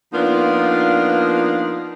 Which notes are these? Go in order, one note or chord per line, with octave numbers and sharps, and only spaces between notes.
F3 A#3 B3 D4 D#4 F4